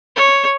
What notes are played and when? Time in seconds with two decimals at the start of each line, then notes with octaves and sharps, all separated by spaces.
0.16 C#5